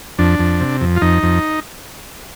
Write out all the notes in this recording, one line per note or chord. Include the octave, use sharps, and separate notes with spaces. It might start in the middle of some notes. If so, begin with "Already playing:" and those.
F2 D4
F2
C3
F2
F4
F2 D#4
F2